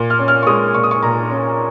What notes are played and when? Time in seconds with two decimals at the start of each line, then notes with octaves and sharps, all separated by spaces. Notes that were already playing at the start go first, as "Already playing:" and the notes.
Already playing: A#2
0.10 F6
0.19 C#4
0.28 F6
0.43 C#6
0.47 G#3 D#6
0.74 A#2 C#6
0.84 D#6
0.91 C#6
1.03 A#2 A#5
1.30 C#4